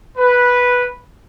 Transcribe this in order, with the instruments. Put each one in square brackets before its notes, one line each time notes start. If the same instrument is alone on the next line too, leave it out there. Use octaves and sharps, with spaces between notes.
[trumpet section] B4